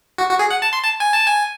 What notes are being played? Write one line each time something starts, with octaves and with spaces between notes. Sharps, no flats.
F#4
F#4
G#4
F#5
A5
C6
A5
G#5
A5
G#5